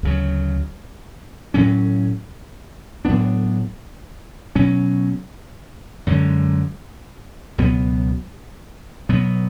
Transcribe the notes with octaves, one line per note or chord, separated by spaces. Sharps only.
D2 C#3 F#3
A2 F#3 C#4
A2 F#3 B3 D4
B2 F#3 C#4
F#2 D3 G#3
C#2 B2 F#3 B3
B2 F#3 B3